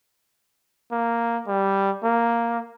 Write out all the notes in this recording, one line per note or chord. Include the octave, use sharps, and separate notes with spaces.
A#3
G3
A#3